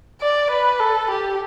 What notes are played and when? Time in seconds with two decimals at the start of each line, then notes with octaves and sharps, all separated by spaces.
0.21 D5
0.50 B4
0.80 A4
1.10 G4